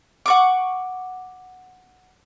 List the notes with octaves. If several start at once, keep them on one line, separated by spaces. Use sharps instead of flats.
F#5 C#6 D6